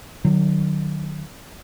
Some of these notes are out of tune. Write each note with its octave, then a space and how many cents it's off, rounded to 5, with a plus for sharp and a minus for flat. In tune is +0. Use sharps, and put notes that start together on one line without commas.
D#3 -40 F#3 +0